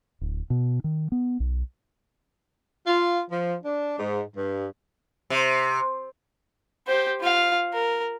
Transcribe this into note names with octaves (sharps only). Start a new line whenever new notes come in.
D1
B2
D#3
B3
B1
F4
F3
D4
G#2
G2
C3
G4 C5
F4 F5
A#4